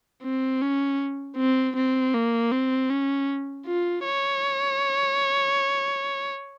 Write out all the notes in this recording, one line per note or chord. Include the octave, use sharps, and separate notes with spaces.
C4
C#4
C4
C4
A#3
C4
C#4
F4
C#5